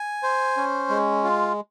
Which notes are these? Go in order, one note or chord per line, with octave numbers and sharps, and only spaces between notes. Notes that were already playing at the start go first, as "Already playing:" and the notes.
Already playing: G#5
C5
C#4
G#3
F4